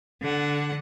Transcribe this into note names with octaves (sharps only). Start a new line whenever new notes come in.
D3 F#5